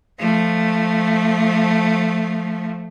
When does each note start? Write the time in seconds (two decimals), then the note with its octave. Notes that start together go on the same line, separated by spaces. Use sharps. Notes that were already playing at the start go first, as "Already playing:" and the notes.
0.19 F3 A3